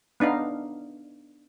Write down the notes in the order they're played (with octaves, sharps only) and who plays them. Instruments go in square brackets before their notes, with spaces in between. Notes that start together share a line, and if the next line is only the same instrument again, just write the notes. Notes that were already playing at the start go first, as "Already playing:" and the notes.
[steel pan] B3 D4 D#4 F5